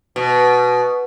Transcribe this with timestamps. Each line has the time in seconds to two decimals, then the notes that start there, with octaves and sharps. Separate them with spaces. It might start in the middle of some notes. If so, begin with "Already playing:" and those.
0.16 B2